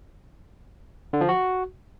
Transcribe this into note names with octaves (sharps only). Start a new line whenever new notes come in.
D3
F3
F#4